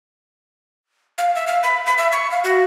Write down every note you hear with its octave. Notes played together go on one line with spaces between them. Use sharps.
F5
E5
F5
B5
B5
E5
C#6
F5
F#4